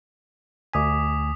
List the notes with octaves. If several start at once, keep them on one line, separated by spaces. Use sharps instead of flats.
D2 G#5 D6 D#6 B6